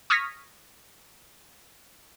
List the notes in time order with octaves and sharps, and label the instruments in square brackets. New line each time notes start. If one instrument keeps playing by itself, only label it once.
[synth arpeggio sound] C#6 D#6 F6 G#6 A#6 B6